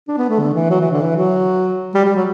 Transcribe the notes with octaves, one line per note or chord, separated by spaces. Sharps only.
D4
B3
A3
D3
E3
F#3
E3
D3
E3
F#3
G3
G3
F#3